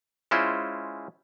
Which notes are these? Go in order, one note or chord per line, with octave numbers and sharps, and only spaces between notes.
G#3 C#4 E4 F4 C5